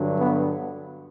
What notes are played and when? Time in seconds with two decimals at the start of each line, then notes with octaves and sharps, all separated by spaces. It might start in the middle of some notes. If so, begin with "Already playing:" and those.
Already playing: G2 D3 F#3
0.19 B3